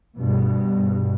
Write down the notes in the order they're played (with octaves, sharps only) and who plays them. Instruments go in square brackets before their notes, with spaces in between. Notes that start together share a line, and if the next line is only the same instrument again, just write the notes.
[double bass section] G2 B2